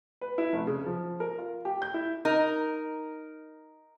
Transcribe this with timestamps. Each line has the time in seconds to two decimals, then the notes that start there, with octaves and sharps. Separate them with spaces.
0.21 B4
0.38 E4
0.53 F1
0.67 C#3
0.86 F3
1.20 A#4
1.38 F4
1.65 G4
1.82 G6
1.94 E4
2.25 D#4 A#4